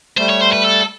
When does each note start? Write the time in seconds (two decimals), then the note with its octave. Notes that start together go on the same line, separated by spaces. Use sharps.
0.18 G3 A3 C5
0.30 C#5
0.41 C5
0.53 B4
0.64 A4